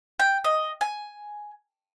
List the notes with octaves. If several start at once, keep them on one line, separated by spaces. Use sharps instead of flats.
G5
D#5
G#5